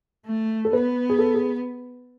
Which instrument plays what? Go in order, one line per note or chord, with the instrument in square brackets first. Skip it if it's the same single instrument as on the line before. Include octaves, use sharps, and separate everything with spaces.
[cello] A3
[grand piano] A4
[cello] B3 [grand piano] B4
[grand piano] G#4
A4
G#4